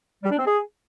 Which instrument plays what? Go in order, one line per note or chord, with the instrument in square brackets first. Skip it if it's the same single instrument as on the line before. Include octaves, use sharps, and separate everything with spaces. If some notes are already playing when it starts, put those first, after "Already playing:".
[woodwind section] G3
D4
C4
G#4